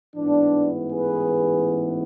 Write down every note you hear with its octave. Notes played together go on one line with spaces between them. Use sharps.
A1 G#2 E3 B3 D4
G#4 B4